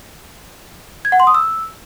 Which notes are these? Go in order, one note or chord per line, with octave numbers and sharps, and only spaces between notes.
G#6
F#5
C6
D#6
E6